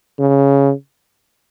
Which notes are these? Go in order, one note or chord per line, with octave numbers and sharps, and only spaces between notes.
C#3